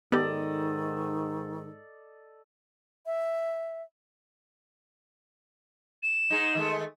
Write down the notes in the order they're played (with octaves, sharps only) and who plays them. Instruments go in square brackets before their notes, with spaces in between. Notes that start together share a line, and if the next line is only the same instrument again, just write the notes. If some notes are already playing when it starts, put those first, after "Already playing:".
[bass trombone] G#2 [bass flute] D#3 [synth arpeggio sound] B3 G4 [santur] A4 D5 D#5
[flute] E5
[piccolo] E7
[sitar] G#2 G#3 D#4
D#3 G#3 A3